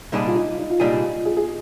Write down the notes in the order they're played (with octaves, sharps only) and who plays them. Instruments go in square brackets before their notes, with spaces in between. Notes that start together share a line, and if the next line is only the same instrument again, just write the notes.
[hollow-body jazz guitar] C2 A#2 G3 D4 G#4 [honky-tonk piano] D#4
[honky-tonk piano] F4
D#4
D#4
F4
[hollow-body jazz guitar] C2 A#2 G3 D4 G#4 [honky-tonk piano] D#4
[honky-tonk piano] G#4
G#4